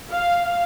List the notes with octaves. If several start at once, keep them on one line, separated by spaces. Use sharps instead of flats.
F5